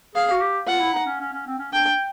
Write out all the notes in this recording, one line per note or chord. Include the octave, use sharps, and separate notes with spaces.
G#4 F5
F#4
G4
F4 F#5
E4
D#4
C#4
C#4
C#4
C4
C#4
D4 G5